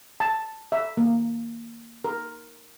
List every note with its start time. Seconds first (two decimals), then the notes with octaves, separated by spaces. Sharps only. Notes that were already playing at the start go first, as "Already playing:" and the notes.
0.20 A5
0.72 E5
0.97 A#3
2.05 A#4